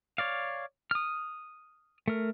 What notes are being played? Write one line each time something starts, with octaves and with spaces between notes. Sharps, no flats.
C#5 D5 F5
D#6 F6
A3 A#4